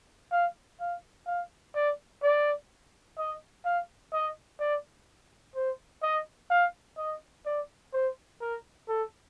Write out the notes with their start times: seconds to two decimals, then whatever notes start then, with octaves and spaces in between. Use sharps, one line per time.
0.32 F5
0.80 F5
1.27 F5
1.75 D5
2.22 D5
3.18 D#5
3.65 F5
4.13 D#5
4.60 D5
5.55 C5
6.03 D#5
6.50 F5
6.98 D#5
7.46 D5
7.93 C5
8.41 A#4
8.88 A4